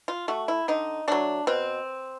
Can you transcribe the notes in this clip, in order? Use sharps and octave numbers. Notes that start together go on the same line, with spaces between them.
F4
A3 F#4
E4
D3 D#4
F#3 A3 D4
B2 C4